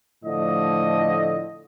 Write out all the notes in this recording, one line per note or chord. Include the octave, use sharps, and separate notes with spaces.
A2 D3 F3 A3 D#5